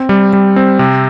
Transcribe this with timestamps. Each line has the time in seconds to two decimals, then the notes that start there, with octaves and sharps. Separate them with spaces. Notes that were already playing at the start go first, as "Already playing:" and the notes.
Already playing: C4
0.09 G3
0.33 G3
0.56 C4
0.79 C3